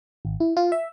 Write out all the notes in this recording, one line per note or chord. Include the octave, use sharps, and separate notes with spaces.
G#1
E4
F4
E5